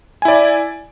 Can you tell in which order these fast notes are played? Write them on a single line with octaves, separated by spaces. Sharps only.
G#5 E4 D5